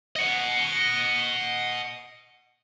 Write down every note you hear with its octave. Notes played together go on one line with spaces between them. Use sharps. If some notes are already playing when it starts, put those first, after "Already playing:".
D#5 F#5